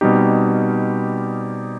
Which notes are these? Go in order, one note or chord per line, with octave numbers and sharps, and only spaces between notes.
B2 G3 C4 D#4 G4